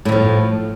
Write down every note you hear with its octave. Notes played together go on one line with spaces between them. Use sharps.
A2 E3 F3